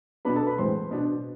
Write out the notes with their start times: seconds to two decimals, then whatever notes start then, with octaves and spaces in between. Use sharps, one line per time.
0.25 B2 B3 D4 B4 B5
0.36 A4 A5
0.47 B4 B5
0.58 A2 E3 G#3 C4 C5 C6
0.91 B2 B3 D4